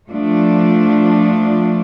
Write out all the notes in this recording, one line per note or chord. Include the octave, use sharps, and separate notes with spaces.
F3 A3 D4